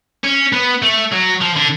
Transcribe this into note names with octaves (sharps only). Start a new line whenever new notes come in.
C#4
B3
A3
F#3
F3
D3